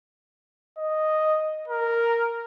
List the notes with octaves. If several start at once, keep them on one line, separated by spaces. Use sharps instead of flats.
D#5
A#4